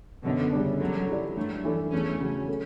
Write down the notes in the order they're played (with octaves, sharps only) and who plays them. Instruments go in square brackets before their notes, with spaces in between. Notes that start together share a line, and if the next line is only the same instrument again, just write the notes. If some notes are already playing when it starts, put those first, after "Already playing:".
[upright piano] F#2 [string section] B2 D3
[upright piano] C#3 G3 D4
[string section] D3 F#3 [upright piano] A3
[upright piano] E4 G4 D5
[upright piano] G2 [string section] F#3 A3
[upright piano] E3 A3 D4
[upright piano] E2 [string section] A3 C#4
[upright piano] C#3 F#3
A3